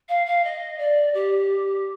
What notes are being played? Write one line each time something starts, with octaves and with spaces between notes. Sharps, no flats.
F5
F5
D#5
D5
G4